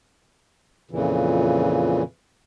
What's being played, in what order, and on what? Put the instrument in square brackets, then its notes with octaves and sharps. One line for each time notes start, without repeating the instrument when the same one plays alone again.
[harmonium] F2 A#2 C#3 E3